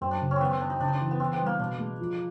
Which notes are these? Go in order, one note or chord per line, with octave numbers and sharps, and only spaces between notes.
F#2 C4
D4
C#3
C#4
D#3 B3 C4
C4
F#3 D4
D#4
C#3 D4
D#4
D4
E3
B3
E3 C4
B3
G3
A#3
B2 D4
G#3
F3